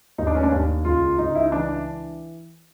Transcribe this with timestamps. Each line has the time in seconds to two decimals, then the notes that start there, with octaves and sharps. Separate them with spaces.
0.18 D#2 D#4
0.27 D4
0.35 C#4
0.43 D4
0.52 D#2
0.85 C#2 F4
1.18 C#2 D#4
1.35 E4
1.44 D#4
1.52 E3 D4